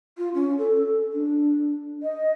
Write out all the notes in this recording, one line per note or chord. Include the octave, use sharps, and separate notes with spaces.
F4
C#4
A4
D4
D#5